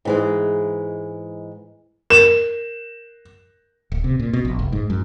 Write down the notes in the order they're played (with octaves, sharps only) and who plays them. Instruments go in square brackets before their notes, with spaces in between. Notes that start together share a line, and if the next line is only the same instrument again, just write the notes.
[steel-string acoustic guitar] G#2 E3 G#3
[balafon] A#4 [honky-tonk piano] E7
[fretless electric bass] D1
C3
A#2
B2
A#1
F1
G#2
F#2